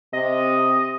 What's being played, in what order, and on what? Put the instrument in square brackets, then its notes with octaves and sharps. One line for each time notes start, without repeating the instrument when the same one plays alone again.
[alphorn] C3 [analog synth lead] D#5